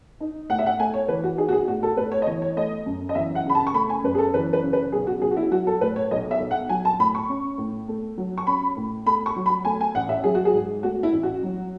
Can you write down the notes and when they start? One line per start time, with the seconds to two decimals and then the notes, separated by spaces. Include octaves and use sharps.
0.20 D#4
0.50 A2 F#5
0.59 E5
0.66 F#5
0.79 A3 G#5
0.94 C#5
1.08 E3 B4
1.23 F#4
1.38 D#4 G#4
1.49 F#4
1.52 G#4
1.68 A2 F#4
1.83 A4
1.97 A3 B4
2.12 C#5
2.22 D#5
2.27 E3 C#5
2.42 C#5
2.56 A3 D#5
2.86 F#2
3.09 D#5
3.15 E3 E5
3.35 F#5
3.45 C#3 B5
3.55 A5
3.67 C#6
3.74 A3 B5
3.90 G#5
4.04 F#2 B4
4.15 G#4
4.18 A4
4.34 E3 B4
4.53 B4
4.63 C#3
4.73 B4
4.92 B1 G#4
5.07 F#4
5.22 B1 G#4
5.31 F#4
5.37 E4
5.51 F#3 F#4
5.67 A4
5.81 A2 B4
5.96 C#5
6.11 B1 D#5
6.31 E5
6.40 B1
6.51 F#5
6.69 F#3 G#5
6.85 A5
6.99 A2 B5
7.15 C#6
7.29 C#4
7.58 A2
7.88 A3
8.18 F#3
8.38 C#6
8.47 C#4 B5
8.77 A2
9.06 A3 B5
9.26 C#6
9.36 F#3
9.46 B5
9.65 A3 G#5
9.81 G#5
9.95 A1 F#5
10.09 E5
10.24 F#3 G#4
10.35 F#4
10.45 G#4
10.54 G#2
10.83 A3 F#4
11.03 E4
11.12 A1
11.23 F#4
11.43 F#3